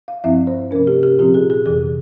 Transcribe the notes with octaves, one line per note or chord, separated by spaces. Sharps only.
F5
G2 F3 C4 E4 E5
C5
C3 F3 A#3 C#4 A#4
G4
G4
A#2 F3 C4 F4 G4
G#4
G#4
F2 C3 E3 G#4